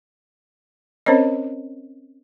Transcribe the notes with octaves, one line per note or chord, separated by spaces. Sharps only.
C4 C#4 A#4 C5 C#5 D#5